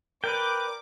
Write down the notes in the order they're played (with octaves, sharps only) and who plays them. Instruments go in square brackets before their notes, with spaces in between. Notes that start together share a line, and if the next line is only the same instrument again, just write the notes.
[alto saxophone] A#4 [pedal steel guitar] B4 D5 G5 [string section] D6